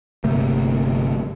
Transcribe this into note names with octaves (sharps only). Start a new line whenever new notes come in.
G1 C3 A3 A#3